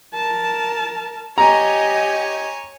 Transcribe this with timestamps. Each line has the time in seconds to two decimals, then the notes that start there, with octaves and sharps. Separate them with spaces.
0.14 A#4 A5
1.38 G4 C#5 D#5 G#5 A#5